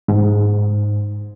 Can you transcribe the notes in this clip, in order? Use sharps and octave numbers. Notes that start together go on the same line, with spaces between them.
G#2